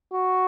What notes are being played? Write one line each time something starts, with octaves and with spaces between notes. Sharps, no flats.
F#4